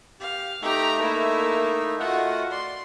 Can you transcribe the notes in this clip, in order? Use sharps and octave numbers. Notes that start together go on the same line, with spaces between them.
G4 F5
A3 D#4 G4 E5 A#5
A#3 E4
A3 F4 F#4 D#5 F#5
D5 C6